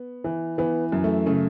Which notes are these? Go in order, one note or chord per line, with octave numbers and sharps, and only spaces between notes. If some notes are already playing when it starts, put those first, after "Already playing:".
Already playing: B3
E3
E3 B3
F#2
A3
C#3 A3